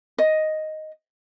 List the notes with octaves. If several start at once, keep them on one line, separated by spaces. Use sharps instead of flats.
D#5